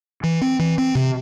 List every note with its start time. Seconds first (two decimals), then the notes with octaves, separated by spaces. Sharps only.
0.23 E3
0.42 C4
0.59 E3
0.78 C4
0.95 C3